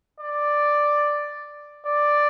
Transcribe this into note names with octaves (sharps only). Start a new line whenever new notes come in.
D5
D5